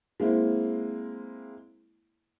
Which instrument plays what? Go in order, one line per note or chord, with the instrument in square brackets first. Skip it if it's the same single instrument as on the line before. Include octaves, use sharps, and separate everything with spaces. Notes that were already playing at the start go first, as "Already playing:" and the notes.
[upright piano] G#3 A#3 C4 E4